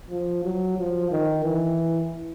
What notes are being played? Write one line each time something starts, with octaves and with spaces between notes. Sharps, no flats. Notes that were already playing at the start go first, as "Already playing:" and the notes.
F3
F#3
F3
D#3
E3